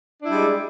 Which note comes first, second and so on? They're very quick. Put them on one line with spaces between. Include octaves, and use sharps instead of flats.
D4 E4 G3 G#3